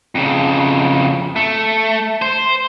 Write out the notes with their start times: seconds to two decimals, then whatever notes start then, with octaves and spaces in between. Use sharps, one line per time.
0.15 F2 C#3
1.36 A3
2.22 C5